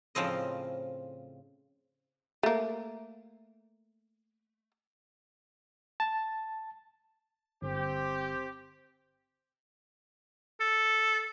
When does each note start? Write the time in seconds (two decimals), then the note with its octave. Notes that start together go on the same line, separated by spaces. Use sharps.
0.15 A2 C#3 F3 C4 D#5
2.43 A3 A#3
6.00 A5
7.62 G1 C4 G4
10.61 A4